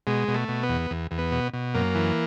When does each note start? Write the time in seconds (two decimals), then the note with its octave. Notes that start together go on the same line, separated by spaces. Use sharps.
0.07 B2 G#3
0.28 B2
0.34 A3
0.48 B2
0.63 B3
0.69 E2
0.91 E2
1.11 E2
1.18 B3
1.32 B2
1.53 B2
1.74 F#2 A#3
1.95 E3